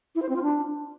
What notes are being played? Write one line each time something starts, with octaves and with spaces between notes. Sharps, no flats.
E4
C5
C4
F4
D4